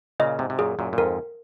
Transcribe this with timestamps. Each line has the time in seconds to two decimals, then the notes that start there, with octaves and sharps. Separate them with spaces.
0.20 A#2 C#3 D#5
0.39 G#2 C3
0.50 C3
0.59 F#2 A#2 G#4
0.79 F#2 A#2
0.93 A#2
0.98 F2 G#2 A#4